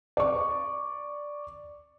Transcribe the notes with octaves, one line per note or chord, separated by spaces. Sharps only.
D5 C#6